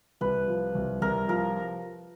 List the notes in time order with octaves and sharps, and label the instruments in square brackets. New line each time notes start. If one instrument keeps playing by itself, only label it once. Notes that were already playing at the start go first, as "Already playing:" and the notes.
[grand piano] C2 [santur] B4
[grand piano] F3
C2
[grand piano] C2 [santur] A#4
[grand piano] F3 [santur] A#4